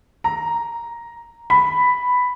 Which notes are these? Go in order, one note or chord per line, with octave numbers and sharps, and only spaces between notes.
A#5
B5